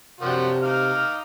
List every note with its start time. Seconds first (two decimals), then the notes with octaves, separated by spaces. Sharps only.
0.21 F#2 C3 F3 D4 F#4 G4
0.63 D#4 F5 D6 F6